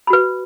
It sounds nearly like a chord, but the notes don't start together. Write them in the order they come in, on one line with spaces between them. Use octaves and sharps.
B5 F#4 B4